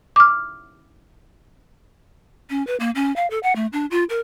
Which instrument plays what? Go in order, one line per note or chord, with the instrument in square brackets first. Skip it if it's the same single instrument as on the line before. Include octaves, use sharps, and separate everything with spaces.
[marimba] D6 F6
[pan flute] C#4
B4
A#3
C#4
F5
A4
F#5
A3
D4
F4
A#4